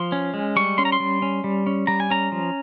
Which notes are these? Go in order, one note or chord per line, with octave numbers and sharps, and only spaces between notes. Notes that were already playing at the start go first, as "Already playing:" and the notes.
Already playing: F3 C6
C#4
G#3
G3 C#6
C#4 C6
A#5
C6
G3
C#4
G3
C#4
G3 A#5
G#5
C#4 A#5
F3